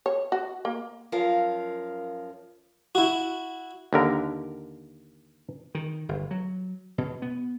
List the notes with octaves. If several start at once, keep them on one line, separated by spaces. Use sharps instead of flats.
C#5
F#4
A#3
F#2 F3 A#4 F5
E4 F#4
D#2 D3 A#4
D#3
G1
F#3
B2
B3